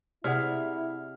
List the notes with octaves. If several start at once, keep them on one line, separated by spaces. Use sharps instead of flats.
C3 E4 G#4 D5 F#5 F6